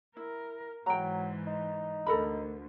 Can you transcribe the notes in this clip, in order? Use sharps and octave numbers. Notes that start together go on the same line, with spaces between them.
E4 A#4
G#2 E3 F#3 G5 A#5
D#4
D2 A4 A#4 B5